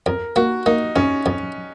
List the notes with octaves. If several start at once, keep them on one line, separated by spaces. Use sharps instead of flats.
F2 A#4
A#3 F#4
A#3 D#4
F2 C#4
F2